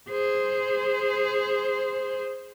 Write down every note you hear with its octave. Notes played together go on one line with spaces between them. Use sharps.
G#4 C5